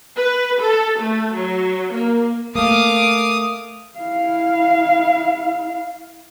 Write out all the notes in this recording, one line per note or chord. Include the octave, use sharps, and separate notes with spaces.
B4
A4
A3
F#3
A#3
A3 A#3 F5 D6 D#6
E4 F5